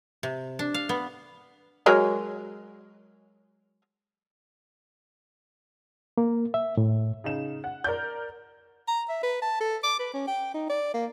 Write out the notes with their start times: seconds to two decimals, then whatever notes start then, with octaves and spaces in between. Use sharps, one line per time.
0.23 C3
0.59 D4
0.74 F5
0.89 B3
1.86 F#3 G#3 A#4
6.18 A#3
6.54 E5
6.77 A2
7.24 C#3 D#4 E7
7.64 F#5
7.84 A#4 D5 G6
8.88 A#5
9.09 E5
9.23 B4
9.42 A5
9.60 A4
9.83 D6
9.99 B4
10.13 C#4
10.27 G5
10.54 D#4
10.69 D5
10.94 A#3